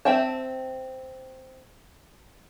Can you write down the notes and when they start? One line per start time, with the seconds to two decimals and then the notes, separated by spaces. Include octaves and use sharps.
0.05 C4 E5 G5 A5